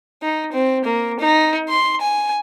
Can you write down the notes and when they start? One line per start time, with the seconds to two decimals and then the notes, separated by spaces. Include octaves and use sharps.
0.23 D#4
0.53 C4
0.85 A#3
1.20 D#4
1.69 C6
2.01 G#5